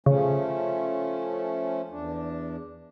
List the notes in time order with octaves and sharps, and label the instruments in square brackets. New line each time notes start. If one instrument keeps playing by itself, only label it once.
[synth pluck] C#3 [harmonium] F3 A3 C#4
[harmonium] E2 D4